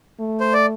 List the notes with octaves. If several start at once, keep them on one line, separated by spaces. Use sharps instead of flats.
A3
C5
D5